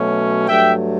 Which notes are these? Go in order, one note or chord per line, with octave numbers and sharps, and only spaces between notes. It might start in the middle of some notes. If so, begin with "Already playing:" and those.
Already playing: B2 F#3 A3 C#4
G2 F#3 A3 E5 G5